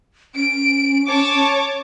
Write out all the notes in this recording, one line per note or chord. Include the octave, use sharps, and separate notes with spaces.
C#4 D7
C#5 A5 D6